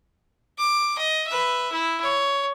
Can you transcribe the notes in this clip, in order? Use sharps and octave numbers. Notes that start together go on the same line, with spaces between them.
D6
D#5
B4 E5
E4
C#5